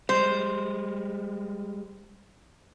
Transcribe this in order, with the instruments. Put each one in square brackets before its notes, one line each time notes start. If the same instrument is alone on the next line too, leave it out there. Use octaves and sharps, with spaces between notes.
[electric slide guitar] G3 G#3 [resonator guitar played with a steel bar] C5